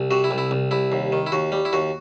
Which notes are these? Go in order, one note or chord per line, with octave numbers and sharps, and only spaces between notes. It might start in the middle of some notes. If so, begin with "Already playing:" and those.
Already playing: C2
C3 F#4
E4
C2
E4
C2
C2 E4
D#2
D#3
E4
D#2 F#4
G3
E4
D#2 F#4